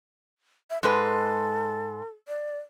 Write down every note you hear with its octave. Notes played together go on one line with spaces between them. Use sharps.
E5
G#2 G#3 A4 B4
D5